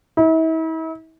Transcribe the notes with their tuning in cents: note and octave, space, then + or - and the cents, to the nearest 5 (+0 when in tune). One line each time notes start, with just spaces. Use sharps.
E4 -40